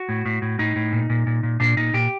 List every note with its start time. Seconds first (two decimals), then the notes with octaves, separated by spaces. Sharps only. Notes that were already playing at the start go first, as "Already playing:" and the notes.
Already playing: F#4
0.09 A2
0.26 A2
0.42 A2
0.59 A2 D#4
0.76 A2
0.93 A#2
1.10 A#2
1.27 A#2
1.43 A#2
1.60 A#2 D4
1.77 A#2 D#4
1.94 A#2 G4